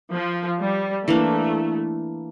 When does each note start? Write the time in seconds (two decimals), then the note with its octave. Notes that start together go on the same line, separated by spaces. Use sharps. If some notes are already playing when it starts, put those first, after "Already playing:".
0.12 F3
0.60 G3
1.07 E3 A3 A#3 D4